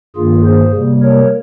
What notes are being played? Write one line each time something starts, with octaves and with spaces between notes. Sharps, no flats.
G2 D#3 A#3 F4 G#4
G#4 C5
C3 G3 A#3
A#4 C#5